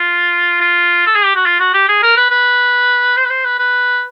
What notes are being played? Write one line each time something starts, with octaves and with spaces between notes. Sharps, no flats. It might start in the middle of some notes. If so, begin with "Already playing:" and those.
Already playing: F4
F4
A4
G#4
G4
F#4
F4
F#4
G4
G#4
A#4
B4
B4
C5
B4
C5
B4
B4